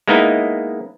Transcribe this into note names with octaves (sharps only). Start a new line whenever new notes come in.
G#3 A#3 B3 D#4 E4